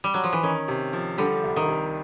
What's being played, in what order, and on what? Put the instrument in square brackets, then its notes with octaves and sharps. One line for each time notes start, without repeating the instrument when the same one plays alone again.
[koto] G3
F#3
F3
E3
[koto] D#3 [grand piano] C#4
[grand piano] C3
F3
[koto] D3 [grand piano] G3
[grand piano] C2
[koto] D#3
[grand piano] C3